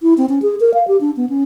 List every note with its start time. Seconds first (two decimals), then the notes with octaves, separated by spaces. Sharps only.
0.02 E4
0.18 C4
0.29 C#4
0.42 G#4
0.60 A#4
0.74 F5
0.88 G4
1.01 D4
1.17 B3
1.29 C#4